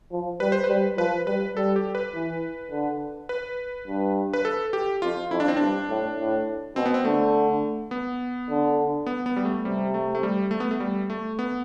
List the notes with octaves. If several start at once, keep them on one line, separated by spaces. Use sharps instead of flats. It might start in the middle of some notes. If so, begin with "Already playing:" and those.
F3
G3 B4
C5
B4
G3
F3 B4
G3 B4
G3 A4
G4
B4
E3
D3
B4
G2
B4
A4
G4
F2 F4
F2 E4
D4
C4
G2 D4
A2
A2
B2 C4
B3
C4
D3 A3
B3
D3
B3
B3
G3
A3
C3 G3
A3
A3
G3
A3
B3
A3
G3
A3
B3